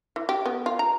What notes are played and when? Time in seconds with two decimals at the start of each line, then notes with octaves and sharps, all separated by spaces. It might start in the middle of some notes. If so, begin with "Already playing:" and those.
0.16 E3
0.29 G4
0.46 B3
0.66 F4
0.79 A#5